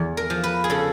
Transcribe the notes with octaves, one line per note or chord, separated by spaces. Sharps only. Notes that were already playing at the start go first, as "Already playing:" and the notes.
Already playing: E2
A#4
F3
B4
G#4
C#3 A4